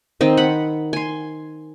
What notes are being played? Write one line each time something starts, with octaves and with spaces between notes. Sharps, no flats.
D#3 C4 D#5
F#5 B5
G#5 C6